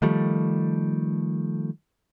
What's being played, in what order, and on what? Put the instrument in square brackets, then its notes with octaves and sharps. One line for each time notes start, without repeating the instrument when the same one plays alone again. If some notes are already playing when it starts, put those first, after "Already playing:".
[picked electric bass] D#3 F3 G3 A3